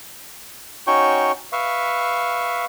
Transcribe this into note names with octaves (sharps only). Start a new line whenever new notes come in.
C#4 D#4 F#4 C#5 G5 C#6
B4 E5 F5 C#6